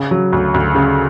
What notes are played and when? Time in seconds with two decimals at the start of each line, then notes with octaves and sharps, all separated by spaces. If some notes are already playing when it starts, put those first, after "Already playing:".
Already playing: C#3
0.11 F#3
0.33 D2
0.54 D2
0.75 C#3